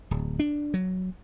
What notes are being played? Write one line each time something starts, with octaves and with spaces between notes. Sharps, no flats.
D1
D4
F#3